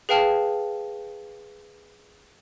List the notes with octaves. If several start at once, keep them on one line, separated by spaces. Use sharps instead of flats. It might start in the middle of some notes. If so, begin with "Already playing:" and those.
G#4 B4 F5 G5 A5 F6